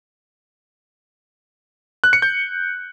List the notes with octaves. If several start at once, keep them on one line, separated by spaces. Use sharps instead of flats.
F#6
C#7
G6